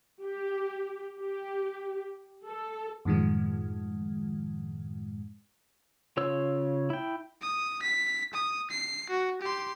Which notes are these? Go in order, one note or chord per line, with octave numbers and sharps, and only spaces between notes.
G4
G4
A4
F#2 A2 D#3 F3 G#3
C#3 F4 C#5 E6
E4 G5
D#6
B6
D#6
C7
F#4
G4 C6